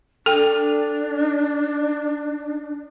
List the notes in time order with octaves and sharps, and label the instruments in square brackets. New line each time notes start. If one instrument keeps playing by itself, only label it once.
[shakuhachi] D4 [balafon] A4 G5